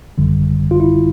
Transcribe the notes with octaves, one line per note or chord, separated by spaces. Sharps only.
G#1 F#2 D3 G3
F4
E4